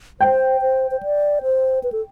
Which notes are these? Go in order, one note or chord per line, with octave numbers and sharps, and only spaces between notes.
C5 G5
C5
C5
D5
C5
B4
A4